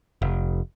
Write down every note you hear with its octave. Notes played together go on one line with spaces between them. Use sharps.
F1